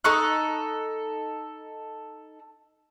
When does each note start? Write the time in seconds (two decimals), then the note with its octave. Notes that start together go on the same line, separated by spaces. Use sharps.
0.04 D#4 A4 C#6 F#6